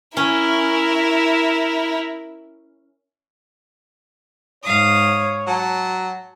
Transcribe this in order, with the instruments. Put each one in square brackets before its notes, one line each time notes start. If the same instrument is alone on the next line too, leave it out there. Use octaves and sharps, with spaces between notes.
[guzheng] C#4 [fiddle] E4 A#4
[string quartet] G#2 F5 D#6 [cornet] C#5
[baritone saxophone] F#3 [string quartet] A5